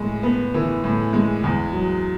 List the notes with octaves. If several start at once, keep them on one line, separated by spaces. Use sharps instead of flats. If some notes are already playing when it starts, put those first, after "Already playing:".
Already playing: A2 G#3
B3
E3
A2
G#3
E2
F#3